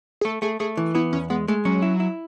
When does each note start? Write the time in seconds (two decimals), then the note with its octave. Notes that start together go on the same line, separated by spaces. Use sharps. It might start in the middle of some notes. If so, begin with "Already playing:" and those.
0.21 G#4
0.25 A3 A4
0.42 A3 G#4
0.60 A3 G#4
0.77 E3
0.95 B3 E4
1.13 E2 C#4
1.30 G#3 B3
1.48 G#3 A3
1.65 F#3 C#4
1.82 E4
2.00 E4